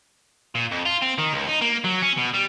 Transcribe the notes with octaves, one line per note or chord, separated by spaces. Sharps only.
A#2
F2
F4
C4
D#3
C#2
D#4
A#3
F#3
C#4
B2
G3